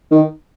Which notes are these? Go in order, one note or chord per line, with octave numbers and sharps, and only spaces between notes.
D#3